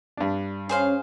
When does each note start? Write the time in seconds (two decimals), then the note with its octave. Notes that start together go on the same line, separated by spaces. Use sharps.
0.17 G2 D4
0.69 C#4 G#4 C5 F5